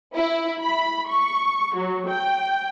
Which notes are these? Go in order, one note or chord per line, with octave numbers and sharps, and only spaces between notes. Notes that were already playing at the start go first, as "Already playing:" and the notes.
E4
B5
C#6
F#3
G5